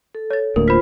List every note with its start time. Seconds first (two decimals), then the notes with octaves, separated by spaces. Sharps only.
0.15 A4
0.30 C#5 A6
0.56 D1 D2 A#3 A#4
0.68 F4 C5 B5 B6